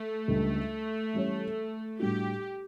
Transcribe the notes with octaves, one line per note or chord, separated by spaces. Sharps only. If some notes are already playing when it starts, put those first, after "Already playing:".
Already playing: A3
C#2 C#3 G3 D4 A4
E3 G3 C#4 G4 C#5
A2 G3 D4 F#4 G4